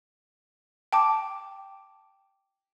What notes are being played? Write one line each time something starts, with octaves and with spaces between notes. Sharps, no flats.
G5 A5 D6